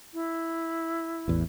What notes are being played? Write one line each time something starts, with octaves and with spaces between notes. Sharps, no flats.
E4
A1 E2